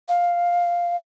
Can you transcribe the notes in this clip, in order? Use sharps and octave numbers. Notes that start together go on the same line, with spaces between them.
F5